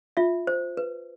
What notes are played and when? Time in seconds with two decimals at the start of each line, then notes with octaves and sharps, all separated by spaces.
0.17 F4 E5
0.47 C5
0.77 B4